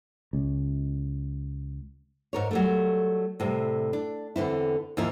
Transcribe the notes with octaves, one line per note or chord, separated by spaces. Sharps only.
C#2
G#2 A#4 C#5
F#3 G3 A3
A2 C3 G3
D4
E2 D3 C4 E4
D#2 G#2 E3 F3 E4 A#4